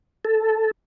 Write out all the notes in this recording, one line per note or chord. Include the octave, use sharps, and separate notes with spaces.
A4